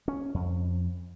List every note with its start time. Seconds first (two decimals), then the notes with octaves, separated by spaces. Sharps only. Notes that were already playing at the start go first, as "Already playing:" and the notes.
0.08 C#4
0.34 F2